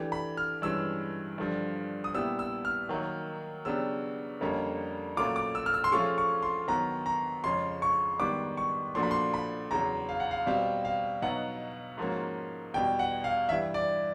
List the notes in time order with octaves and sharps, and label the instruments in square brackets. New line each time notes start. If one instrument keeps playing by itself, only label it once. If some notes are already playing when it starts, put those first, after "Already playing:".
Already playing: [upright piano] E3 A3 D4 G4
[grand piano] B5
F6
[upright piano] G2 E3 G#3 C#4 [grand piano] E6
[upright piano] G2 D3 F3
[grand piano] D#6
[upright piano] A#2 G3 B3 E4 G4 [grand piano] E6
[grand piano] E6
F6
[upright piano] D#3 F#3 A#3 D#4
[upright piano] C#3 F#3 B3 D4 G4 [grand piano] E6
[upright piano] F2 D3 G3 A#3 C#4
[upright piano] A#2 F#3 A3 C#4 F4 [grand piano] D6
[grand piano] D6
E6
F6
E6
C6
[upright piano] F3 A3 C#4 F4 G#4 [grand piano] C#6
[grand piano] C#6
C6
[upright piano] D#3 F#3 B3 [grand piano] A#5
[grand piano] A#5
[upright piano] F2 C#3 F3 G#3 C#4 [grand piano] C6
[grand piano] C#6
[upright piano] G#2 D#3 G3 B3 [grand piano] D6
[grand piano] C#6
[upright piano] A#2 F3 A3 D4 F#4 [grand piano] C6
[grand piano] B5
C6
B5
[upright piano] E2 C#3 F#3 [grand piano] A#5
[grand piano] F5
F#5
F5
[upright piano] B2 G3 C4 [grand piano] F5
[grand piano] F5
[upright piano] B2 F#3 B3 D#4 [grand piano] F#5
[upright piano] G#2 F3 A#3 C#4 F#4
[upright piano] E2 B2 G3 [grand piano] G5
[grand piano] F#5
F5
[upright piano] G2 E3 G3 [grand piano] E5
[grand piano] D5